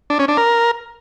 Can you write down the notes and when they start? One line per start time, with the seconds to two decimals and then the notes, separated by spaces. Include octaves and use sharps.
0.10 D4
0.19 C#4
0.28 D4
0.37 A#4